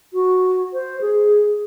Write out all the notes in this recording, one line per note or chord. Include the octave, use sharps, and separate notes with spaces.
F#4
C5
G#4